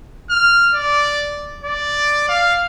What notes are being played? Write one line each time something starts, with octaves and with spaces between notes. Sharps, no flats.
F6
D5
D5
F5